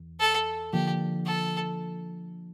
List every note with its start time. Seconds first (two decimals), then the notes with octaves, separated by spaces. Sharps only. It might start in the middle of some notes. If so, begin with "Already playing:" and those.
Already playing: E2
0.20 A4
0.73 D3 F3 A#3 G4
1.26 A4